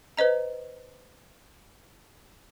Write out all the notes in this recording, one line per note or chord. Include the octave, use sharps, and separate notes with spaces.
B4 C5 D#5 A#5